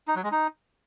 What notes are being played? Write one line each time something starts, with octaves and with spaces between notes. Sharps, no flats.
D#4
F#3
G#3
D#4